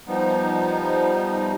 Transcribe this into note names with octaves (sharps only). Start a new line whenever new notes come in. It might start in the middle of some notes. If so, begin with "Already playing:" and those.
F3 G3 B3 D#4